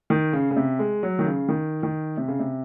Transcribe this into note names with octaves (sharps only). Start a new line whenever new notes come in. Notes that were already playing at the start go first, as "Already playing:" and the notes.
D#3
C#3
C#3
C3
G#3
F#3
D#3
C#3
D#3
D#3
C3
C#3
C3